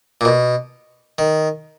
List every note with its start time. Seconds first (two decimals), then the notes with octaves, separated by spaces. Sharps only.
0.21 A#2
0.25 B2
1.18 D#3